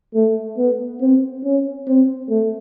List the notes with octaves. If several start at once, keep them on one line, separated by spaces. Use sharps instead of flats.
A3
B3
C4
C#4
C4
A3